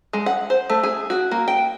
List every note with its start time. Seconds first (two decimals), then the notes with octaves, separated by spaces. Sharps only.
0.13 G#3
0.26 F#5
0.50 C5
0.70 A3
0.83 G#4
1.10 F#4
1.31 A#3
1.48 G5